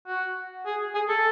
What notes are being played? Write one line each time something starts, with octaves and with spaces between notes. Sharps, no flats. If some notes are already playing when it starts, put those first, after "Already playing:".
F#4
G#4
G#4
A4